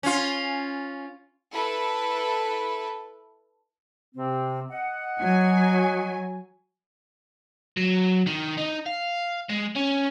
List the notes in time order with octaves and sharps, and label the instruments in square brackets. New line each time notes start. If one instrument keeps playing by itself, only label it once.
[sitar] C#4 F4
[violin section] E4 A4 B4
[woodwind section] C3 C4
D#5 F#5
[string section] F#3 G#5
[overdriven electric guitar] F#3
D#3
D#4
F5
G#3
C#4